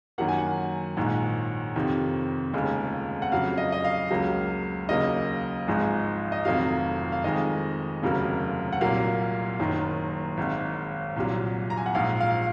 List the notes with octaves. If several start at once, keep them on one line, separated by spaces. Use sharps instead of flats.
F#2 D#3 F#3 A#3 F#5
G#5
F#5
A#1 G#2 D#3 G#3
F2 C3 D#3
F1 D#2 C#3 G#3
F#5
F2 C#3 F#3 F5
D#5
D#5
F5
C#2 C#3 F#3 A#3
D#2 C#3 F#3 A#3 D#5
G#1 G#2 F3 G#3
D#5
F1 F2 D#3 F#3 F5
F5
F2 D#3 G#3 D#5
F1 D#2 C#3 F#3 A#3
F#5
C2 A#2 F#3 A#3 F5
F#1 F#2 D#3
G#1 G#2 D#3
C2 A#2 F#3
A#5
G#5
F#5
A#1 G#2 F3 F5
F5